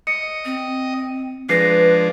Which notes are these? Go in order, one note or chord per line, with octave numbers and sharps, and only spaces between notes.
D#5 C#7
C4
F3 G#3 D4 B4 A#6 C7